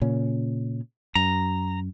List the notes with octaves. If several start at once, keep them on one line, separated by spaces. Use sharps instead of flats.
A#2 C#3 C#4
F#2 A#5